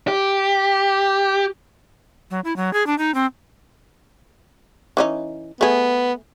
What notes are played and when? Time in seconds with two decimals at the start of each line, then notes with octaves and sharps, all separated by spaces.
0.08 G4
2.30 F#3
2.44 E4
2.56 F#3
2.73 G#4
2.87 D4
2.98 D#4
3.14 C4
4.97 E3 C#4 D#4
5.61 A3 B3 G#4